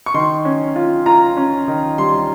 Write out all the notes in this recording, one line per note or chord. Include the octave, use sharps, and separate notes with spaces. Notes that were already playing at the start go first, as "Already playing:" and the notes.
C#6
D#3 C6
C#4
F4
F4 A#5
C#4
D#3
G3 C6